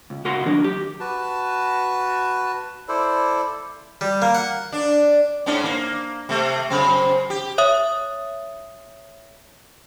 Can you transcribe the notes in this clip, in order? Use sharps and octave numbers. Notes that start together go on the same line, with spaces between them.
C#2
C#2 F#4 A#4 F#5 C6
D#3 F#3 D4 A#4
G4
F#4 B4 A5
E4 A4 C5 D5
G3
A#3
F#5
D4
G#2 C#4 D4
A#3
C3 A3
F#2 C#3 C4
G4
C#5 E5 D#6